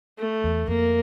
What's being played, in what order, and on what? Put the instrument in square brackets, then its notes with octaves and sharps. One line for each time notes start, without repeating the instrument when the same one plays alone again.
[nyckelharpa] A3
[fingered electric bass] E2
[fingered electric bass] F2 [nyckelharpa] A#3